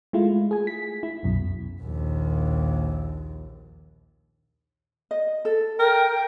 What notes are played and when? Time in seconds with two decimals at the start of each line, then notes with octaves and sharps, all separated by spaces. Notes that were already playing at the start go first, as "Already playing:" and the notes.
0.13 G#3 A3 E4 F4
0.51 G#4 G#5
0.67 B6
1.03 E4
1.23 C2 F#2 B2
1.81 A#1 D#2
5.11 D#5
5.45 A4
5.79 A#4 G5